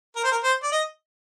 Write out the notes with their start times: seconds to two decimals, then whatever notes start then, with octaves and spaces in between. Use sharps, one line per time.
0.16 A#4
0.24 C5
0.32 A#4
0.44 C5
0.63 D5
0.72 D#5